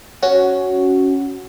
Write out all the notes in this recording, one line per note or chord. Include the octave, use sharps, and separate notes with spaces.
C#4 F#4